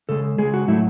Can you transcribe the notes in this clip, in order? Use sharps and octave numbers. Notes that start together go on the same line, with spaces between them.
C#3 G#3 A4
C#3 G#3 G#4
F#4
A2 F#3 A3 E4